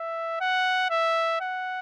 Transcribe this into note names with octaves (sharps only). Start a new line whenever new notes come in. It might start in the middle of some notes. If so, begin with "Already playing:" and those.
Already playing: E5
F#5
E5
F#5